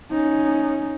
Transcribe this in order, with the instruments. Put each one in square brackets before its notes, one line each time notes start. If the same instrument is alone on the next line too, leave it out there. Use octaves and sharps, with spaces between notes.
[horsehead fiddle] C#4 D#4